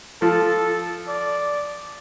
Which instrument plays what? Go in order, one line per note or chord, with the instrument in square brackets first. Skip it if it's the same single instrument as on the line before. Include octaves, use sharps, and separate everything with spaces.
[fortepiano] F3 [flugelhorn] A4
[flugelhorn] D5